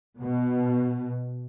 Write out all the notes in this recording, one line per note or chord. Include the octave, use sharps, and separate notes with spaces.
B2